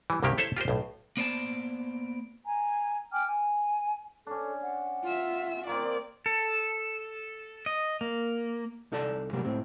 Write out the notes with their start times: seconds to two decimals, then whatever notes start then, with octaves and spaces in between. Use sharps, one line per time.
0.10 E3 G3
0.23 C2 G2 C3 D#3 A#3 G4
0.38 E4 A4 C5 C#5 E5
0.57 F4 G4 A#4 C5
0.68 B1 A2
1.17 A#3 B3 C5 D5 E5 A5
2.46 G#5 A#5
3.13 G5 G#5 D6 F6
3.26 G#5
4.27 C#4 D4 A4
4.62 F#5
5.03 F4 E5
5.67 D#3 A#3 C4 D5
6.26 A4
7.66 D#5
8.01 A#3
8.92 C2 D#4 A4 D5 A5
9.33 C3 F#3 G3 A#3
9.45 C#2 A2 C4